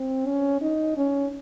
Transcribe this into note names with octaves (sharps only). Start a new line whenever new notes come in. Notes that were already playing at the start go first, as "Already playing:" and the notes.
Already playing: C4
C#4
D#4
C#4